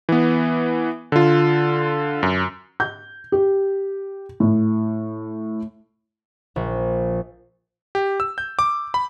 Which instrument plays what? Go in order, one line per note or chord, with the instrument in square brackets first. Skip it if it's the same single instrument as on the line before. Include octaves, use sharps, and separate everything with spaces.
[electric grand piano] E3 B3
D3 F4
F#2
[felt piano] G6
G4
A2
[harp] A#1
[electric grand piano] G4
E6
G6
D6
B5